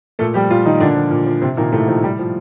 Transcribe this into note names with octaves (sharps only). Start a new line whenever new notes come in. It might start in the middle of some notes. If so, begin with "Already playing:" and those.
A#2 A3 A4
F3 G3 G4
A#2 F3 F4
D#3 F3 D#4
A#2 D3 D4
F3
A#2
F3
C3 C4
A#2 D#3 A#3
A2 C3 A3
D#3 F3
A2 G3
F3